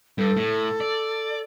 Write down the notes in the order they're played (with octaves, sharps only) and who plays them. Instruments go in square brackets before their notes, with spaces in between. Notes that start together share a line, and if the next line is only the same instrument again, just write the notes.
[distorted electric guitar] G2 [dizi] A4
[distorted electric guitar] A2
D5